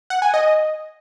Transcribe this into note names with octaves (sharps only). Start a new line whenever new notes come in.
F#5
G#5
D#5